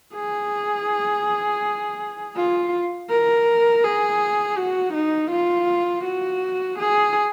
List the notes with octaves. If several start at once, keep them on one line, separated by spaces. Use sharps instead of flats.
G#4
F4
A#4
G#4
F#4
D#4
F4
F#4
G#4